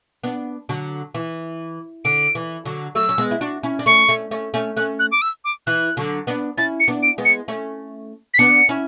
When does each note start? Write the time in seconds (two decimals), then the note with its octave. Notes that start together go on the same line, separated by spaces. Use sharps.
0.24 B3 D4
0.69 D3 F#3
1.14 E3
2.05 D3 D7
2.35 E3
2.65 D3 F#3
2.95 F#3 A3 E6
3.09 C#4
3.18 G#3 B3
3.31 E4
3.41 D4 F#4
3.63 C#4 E4
3.79 D4
3.86 A3 C#4 C#6
4.09 A3 C#4
4.31 A3 C#4
4.54 A3 C#4
4.77 A3 C#4 F#6
4.99 F#6
5.11 D6
5.22 E6
5.44 D6
5.67 E3 F#6
5.97 D3 F#3
6.27 B3 D4
6.58 C#4 E4 A6
6.80 C#7
6.88 B3 D4
7.03 D7
7.18 G#3 B3
7.25 C#7
7.48 A3 C#4
8.34 B6
8.39 B3 D4 C#7
8.69 C#4 E4